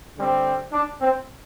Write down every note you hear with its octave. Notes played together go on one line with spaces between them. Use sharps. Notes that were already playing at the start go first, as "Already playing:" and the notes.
D3 G3 C4
D4
C4